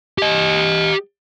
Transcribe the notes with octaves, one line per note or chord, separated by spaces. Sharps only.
G4 D#5